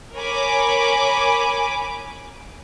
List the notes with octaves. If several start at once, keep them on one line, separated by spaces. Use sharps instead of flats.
A#4 C#5 G#5 B5 D6